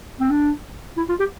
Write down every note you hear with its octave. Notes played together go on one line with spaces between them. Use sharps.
C4
D4
E4
F4
G4